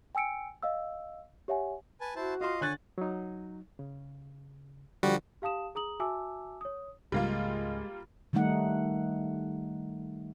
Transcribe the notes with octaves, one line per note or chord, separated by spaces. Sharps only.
G5 G#5 E6 C#7 D7
D#5 F5 E6
G4 C#5 E5 F#5 G#5
B4 G#5 A5
E4 F#4 C5 A5
F4 D#5 F5 C6
D3 C#5 G#5 F#6 A6
F#3 D#4
C#3
D3 F3 G3 F#4
G4 F5 A5 D#6 E7
G#4 A#5 D#6 F#7
F#4 E5 G#5 A5 D6 E6
C#5 D#6
C#2 G#2 C#3 G3 G#3 A#3 F4
D#3 G3 A3 D#4 F#5